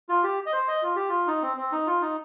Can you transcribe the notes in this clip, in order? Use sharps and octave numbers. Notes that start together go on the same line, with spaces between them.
F4
G4
D#5
C5
D#5
F4
G4
F4
D#4
C4
C4
D#4
F4
D#4